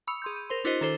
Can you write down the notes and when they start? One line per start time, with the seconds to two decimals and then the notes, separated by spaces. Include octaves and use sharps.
0.07 B5 C#6 D#6 E6 C#7 F7
0.22 G#4 C6 G6
0.36 D#7
0.50 A#4 C5 C6
0.64 D4 E4 F#4 A#4 C5 D#5
0.81 D#3 D4 A4 C5